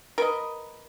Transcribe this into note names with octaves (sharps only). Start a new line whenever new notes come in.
A#4 B4 D#5